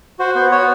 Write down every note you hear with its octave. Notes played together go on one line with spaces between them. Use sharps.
F#4 C5
B3 C5
F#4 C#5